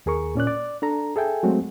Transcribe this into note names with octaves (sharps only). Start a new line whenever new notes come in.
D#2 G#4 A#4 C#6
A#2 C#4 D5 F#6
D5
D4 A4 A#5
G#4 A4 E5 G5 G#5
F#3 G#3 A3 C4 F#4